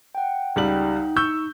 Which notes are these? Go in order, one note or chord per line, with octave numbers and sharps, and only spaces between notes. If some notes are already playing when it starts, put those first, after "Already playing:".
F#5 G5
C#2 G3 D#4 F#7
C#6 E6 G6